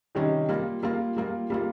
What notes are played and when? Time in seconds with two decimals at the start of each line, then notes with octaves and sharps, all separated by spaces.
0.15 C3 D#3 G3 C#4
0.49 G3 A#3 F4
0.83 G3 A#3 F4
1.16 G3 A#3 F4
1.50 G3 A#3 F4